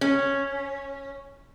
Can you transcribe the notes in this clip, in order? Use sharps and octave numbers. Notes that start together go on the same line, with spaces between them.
C#4